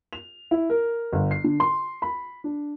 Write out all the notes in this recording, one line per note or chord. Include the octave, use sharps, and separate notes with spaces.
F7
E4
A#4
G1
C7
D3
C6
B5
D4